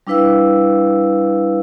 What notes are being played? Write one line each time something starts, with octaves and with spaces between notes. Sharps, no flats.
G3 D4 E4 B4 F5 E6